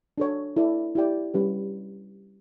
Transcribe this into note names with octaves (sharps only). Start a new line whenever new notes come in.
D4 A4 C#5
E4 A4 D5
E4 G4 D5 G5
G3 C#4 G4 B4